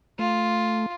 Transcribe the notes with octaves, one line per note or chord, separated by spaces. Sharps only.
A3 F4